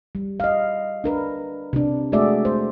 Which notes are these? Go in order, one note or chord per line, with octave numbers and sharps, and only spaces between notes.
G3
D#5 F5
D4 A#4 B4
C3 D4
G#3 A3 F#4 G#4 D5 E5
C5